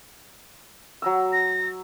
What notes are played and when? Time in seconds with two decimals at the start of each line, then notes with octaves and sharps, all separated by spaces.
1.02 F#3 A#5 E6
1.33 A#6